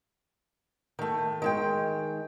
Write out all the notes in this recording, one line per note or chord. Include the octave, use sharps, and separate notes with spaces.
D#3 A3
D#3 G#3 G5